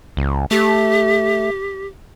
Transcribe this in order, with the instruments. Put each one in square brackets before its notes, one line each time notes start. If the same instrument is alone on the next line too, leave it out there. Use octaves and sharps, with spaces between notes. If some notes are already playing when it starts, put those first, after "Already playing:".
[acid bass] C#2
[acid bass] A3 [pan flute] G4